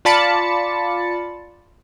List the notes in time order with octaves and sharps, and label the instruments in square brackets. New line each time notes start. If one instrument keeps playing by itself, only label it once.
[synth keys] F4 D5 A5 B5 A6 C#7